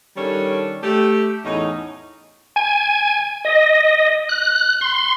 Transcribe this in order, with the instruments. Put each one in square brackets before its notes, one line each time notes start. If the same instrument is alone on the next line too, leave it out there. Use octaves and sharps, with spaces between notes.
[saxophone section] D#3 G3 C#4 D4 A4 C#5
A3 G4
E2 A2 C#4 D#4
[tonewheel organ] G#5
D#5
F#6
C6